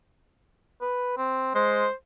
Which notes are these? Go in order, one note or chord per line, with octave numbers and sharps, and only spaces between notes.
B4
C4
G#3 C5